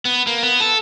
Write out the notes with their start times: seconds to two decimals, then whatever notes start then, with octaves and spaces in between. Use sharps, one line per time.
0.05 B3
0.27 A#3
0.43 B3
0.60 A4